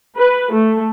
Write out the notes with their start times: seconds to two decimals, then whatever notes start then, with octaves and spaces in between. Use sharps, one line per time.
0.17 B4
0.53 A3